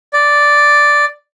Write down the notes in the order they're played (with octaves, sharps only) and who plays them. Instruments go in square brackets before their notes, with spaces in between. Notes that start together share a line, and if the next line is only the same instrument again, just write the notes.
[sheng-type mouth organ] D5